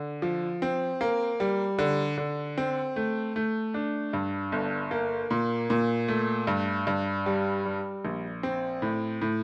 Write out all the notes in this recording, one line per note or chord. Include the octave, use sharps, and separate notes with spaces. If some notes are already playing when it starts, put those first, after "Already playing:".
Already playing: D3
F3
C4
A#3
G3
D3
D3
C4
A3
A3
D4
G2
G1
A#3
A#2
A#2
A3
G2
G2
G3
G3
A#1
C4
A2
A2